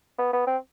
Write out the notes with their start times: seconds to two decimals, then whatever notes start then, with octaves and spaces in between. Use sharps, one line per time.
0.19 B3
0.33 B3
0.47 C4